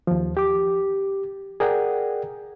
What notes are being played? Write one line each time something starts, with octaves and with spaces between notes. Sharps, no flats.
D#2 F3
G4 D6
G#4 A#4 D5 F#5 G5